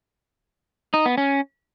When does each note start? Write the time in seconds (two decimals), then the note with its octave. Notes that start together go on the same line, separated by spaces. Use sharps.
0.94 D#4
1.06 B3
1.18 C#4